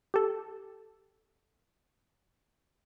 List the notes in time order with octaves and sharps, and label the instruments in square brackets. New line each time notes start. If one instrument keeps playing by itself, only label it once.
[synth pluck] G4 A4